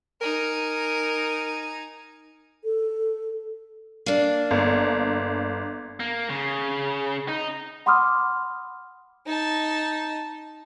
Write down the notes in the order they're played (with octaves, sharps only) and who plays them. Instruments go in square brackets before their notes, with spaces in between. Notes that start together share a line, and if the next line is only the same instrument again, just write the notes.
[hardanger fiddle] D#4 G#5 [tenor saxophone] A#4
[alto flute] A4
[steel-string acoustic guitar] A#3 D4
[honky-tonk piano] G1
[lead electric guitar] A#3
C#3
D#4
[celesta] F#5 B5 C6 D6 D#6 F6
[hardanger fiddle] D#4 A5